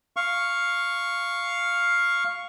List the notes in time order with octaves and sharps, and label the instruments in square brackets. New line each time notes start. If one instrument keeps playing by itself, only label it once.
[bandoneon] F5 C#6